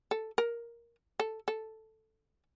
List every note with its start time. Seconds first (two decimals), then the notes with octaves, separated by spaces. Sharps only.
0.11 A4
0.38 A#4
1.20 A4
1.48 A4